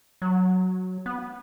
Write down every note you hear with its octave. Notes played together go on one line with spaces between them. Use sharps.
F#3
B3